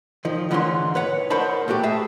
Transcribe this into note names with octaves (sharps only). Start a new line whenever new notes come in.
D#3 F3
G#2 D3 E3 F4 C#5 C6
B4 C#5 F#5
G#2 A#4 C5 C#5 A5 B5
A#2 A3 F#4 G4
G#4 E5 A5